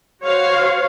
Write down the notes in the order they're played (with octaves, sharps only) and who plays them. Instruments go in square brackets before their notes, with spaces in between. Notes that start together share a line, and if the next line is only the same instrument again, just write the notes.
[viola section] F#4 C5 C#5 F5